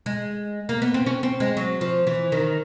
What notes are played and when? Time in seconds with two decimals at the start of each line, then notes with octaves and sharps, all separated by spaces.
0.06 G#3
0.69 A#3
0.82 B3
0.94 C4
1.06 C#4
1.23 C4
1.40 G#3
1.57 F#3
1.81 F3
2.07 E3
2.32 D#3